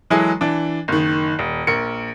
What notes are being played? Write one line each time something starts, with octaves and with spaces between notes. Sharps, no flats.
E3 F#3 G#3 E4 G#4 A4
E3 D4
F#1 D#3
D#1
A#1 A#4 C#7